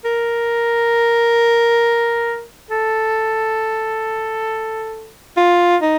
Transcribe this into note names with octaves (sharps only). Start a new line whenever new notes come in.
A#4
A4
F4
D#4